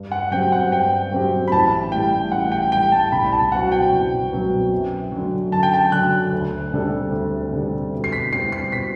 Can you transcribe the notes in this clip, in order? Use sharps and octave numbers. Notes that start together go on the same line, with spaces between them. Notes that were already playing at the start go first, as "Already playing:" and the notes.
Already playing: G2
F#5
F#3 C4 G4 G5
F#5
G2 G5
F#3 C4 G4
B5
A1 A5
A2 G3 G5
A1 F#5
G5
A2 G3 G5
A5
C2 B5
A5
B2 F#3 C4 F#4 F#5
G5
C2
B2 F#3 C4 F#4
F#2
D3 F#3
F#2 A5
G5
A5
D3 F#3 F#6
D2
C3 G3 D4 A4
D2
C3 G3 D4 A4
B2
C7
B6
G3 C4 E4 C7
C7
B2 B6